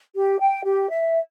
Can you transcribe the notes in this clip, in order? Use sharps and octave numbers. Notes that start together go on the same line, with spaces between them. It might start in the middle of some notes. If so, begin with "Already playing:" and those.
G4
G5
G4
E5